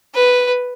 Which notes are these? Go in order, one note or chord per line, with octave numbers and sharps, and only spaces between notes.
B4